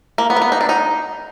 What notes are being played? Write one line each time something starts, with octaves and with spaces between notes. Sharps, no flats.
A#3
B3
A#3
B3
D#4
D4
D#4